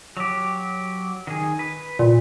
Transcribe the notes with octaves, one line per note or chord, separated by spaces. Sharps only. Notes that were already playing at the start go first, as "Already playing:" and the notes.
F#3 G4
D#3 G#4
B4
A#2